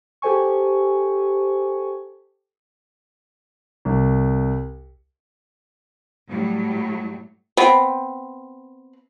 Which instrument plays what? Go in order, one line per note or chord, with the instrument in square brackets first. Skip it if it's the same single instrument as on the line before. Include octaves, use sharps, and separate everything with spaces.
[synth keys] G4 A4 C5 G#5 C#6
[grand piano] C2
[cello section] A2 F#3 G3
[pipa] B3 C4